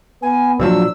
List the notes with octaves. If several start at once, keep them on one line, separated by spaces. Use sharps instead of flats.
B3 G#5
A#2 F3 F#3 D4 E6